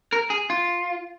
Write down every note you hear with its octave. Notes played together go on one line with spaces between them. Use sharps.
A#4
G#4
F4